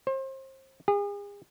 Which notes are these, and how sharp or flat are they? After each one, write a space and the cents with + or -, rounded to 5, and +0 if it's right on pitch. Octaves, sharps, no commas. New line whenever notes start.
C5 +30
G#4 -40